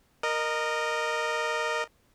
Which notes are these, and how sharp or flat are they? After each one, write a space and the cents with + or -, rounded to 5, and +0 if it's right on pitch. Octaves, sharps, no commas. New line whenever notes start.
A#4 +0 D#5 -20